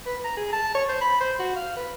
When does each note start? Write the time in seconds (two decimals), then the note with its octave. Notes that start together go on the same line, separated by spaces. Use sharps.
0.06 B4
0.24 A#5
0.37 G#4
0.53 A5
0.74 C#5
0.89 C5
1.01 B5
1.20 C5
1.39 F#4
1.56 F5
1.76 B4